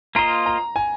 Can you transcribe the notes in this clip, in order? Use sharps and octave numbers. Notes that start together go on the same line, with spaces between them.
A#3 F4 C5 D#5 A#5
A#5
G#5